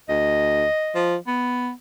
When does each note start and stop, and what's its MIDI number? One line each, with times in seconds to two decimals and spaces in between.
0.09 0.66 38
0.09 1.18 75
0.95 1.16 53
1.27 1.71 59